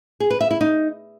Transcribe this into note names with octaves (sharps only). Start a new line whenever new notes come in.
G#4
B4
E5
E4
D#4